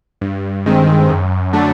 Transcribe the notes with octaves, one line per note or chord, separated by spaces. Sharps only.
G2
D#3 G#3 C4
F#2
D3 F#3 A3 D4